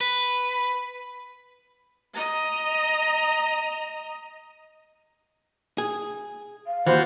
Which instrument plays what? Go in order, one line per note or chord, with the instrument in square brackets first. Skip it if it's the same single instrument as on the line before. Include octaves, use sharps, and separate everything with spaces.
[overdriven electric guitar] B4
[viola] D#5 A#5
[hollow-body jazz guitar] G#4
[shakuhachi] F5
[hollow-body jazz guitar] D#2 E3 [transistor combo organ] F4 F#4 [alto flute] C5